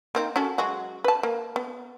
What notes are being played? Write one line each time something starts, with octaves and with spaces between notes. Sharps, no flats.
A#3 C4 D#4
C#4 F#4 A4
F#3 G#3 F#4
B4 A5
A#3
B3